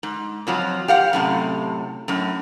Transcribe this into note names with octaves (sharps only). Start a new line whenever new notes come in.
G#2
F2 F3 F#3
G4 F5 F#5
F#2 A2 C3
F#2 A2